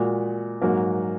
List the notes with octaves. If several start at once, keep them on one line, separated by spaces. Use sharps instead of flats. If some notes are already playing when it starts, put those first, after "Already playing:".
Already playing: A#2 G#3 F#4 A#4
G#2 F#3 A#3 F#4 A#4